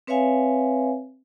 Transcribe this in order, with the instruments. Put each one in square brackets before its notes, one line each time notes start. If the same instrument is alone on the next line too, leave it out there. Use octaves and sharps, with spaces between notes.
[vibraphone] C4 B4 C#5 E5 F5 G#5